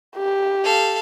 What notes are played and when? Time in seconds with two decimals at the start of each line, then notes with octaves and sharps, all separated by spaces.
0.17 G4
0.64 A4 F5